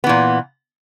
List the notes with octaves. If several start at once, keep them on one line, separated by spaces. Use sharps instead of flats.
A#2 E3 B3